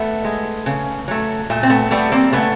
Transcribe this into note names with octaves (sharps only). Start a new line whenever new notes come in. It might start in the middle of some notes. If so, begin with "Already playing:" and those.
Already playing: A3 B3
G#3
C#3
F#3 A3
A#2 A3
C4
A3 B3
G3 A3 B3
A#3 C4
C#3 A3 B3